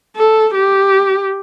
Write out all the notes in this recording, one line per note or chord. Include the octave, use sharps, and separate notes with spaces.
A4
G4